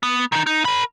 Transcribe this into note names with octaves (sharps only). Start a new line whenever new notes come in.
B3
D#3 D#4
D#4
A#4 B5